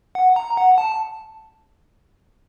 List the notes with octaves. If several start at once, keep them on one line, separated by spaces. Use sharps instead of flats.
F#5
A#5
F#5
A5